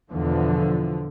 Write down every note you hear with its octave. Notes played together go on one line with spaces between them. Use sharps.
E2 B2 D3 F3